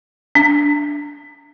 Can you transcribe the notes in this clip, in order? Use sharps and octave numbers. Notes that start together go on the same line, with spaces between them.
D4